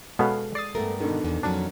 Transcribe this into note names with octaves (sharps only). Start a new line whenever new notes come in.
B2 G#3 B3 C#4 A4 F5
D5 D#6 A6 C7
G2 A3 B3 A#4
B2 D3 D#3
E2
F2 F#3 C#4 D4